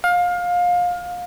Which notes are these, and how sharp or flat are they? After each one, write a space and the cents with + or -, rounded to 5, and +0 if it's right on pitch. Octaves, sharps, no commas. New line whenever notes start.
F5 +25